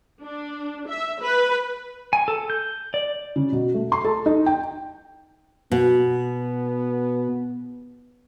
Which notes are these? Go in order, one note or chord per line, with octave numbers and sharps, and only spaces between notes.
D4
E5
B4
G#5
A4
G6
D5
C#3
B2
A3
C6
A4
D#4
G5
B2 B3